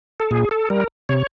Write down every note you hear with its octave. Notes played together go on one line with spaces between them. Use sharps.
A4
A#2 G#4
A4
G3 A#4
C3 C#5